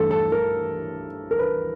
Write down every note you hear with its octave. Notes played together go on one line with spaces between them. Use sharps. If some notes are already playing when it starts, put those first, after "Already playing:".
Already playing: G2 E3 A3 D4 A4
A4
A#4
A#4
B4